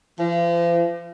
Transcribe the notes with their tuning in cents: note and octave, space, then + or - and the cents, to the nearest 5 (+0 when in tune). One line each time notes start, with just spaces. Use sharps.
F3 -40